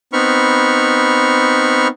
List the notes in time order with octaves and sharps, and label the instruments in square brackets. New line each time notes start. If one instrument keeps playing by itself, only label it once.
[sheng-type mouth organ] B3 C4 D#4 B5 C#6 F6